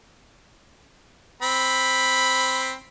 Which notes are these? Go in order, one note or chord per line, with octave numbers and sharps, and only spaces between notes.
C4 B5